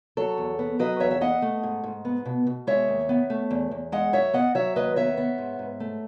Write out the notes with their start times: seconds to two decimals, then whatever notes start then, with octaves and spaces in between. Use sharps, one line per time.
0.17 F#3 A4 C#5
0.38 E2
0.59 B3
0.79 F#3 B4 D#5
1.00 E2 C#5 E5
1.11 E5
1.21 B3 D#5 F#5
1.42 A3
1.63 G#2
1.84 G#2
2.05 B3
2.25 B2
2.47 B2
2.67 G#3 C#5 E5
2.88 D#2
3.09 B3
3.30 A3
3.51 E2
3.71 E2
3.92 G#3 D#5 F#5
4.13 F#2 C#5 E5
4.34 B3 D#5 F#5
4.55 F#3 C#5 E5
4.76 D#2 B4 D#5
4.96 B3 C#5 E5
5.17 B3
5.38 G#2
5.59 G#2
5.80 A3